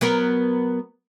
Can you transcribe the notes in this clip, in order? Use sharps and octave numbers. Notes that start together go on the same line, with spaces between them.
F#3 B3 A#4